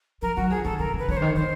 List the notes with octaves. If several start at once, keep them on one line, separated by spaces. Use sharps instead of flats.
F3 A#4
F#3 F#4
F3 G#4
D#3 A4
C#3 A#4
C#3 B4
D3 C#5
D#3 C5
D3 C5